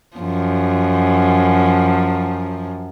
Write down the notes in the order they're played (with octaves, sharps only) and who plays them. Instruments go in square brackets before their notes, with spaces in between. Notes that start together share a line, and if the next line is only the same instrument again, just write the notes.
[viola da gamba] F#2 F3